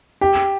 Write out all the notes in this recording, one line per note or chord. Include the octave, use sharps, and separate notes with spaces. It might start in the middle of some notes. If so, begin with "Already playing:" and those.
G4